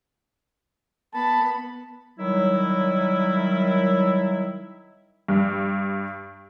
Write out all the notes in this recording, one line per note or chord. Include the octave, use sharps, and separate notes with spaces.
B3 A5 B5
D#3 F#3 G3 E4
G2